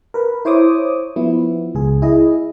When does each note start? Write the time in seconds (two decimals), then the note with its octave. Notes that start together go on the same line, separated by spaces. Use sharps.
0.14 A#4 B4
0.45 E4 C5 C#5 D6 D#6
1.16 F3 B3 E4
1.75 C#2 G#4
2.02 E4 G#4 D#5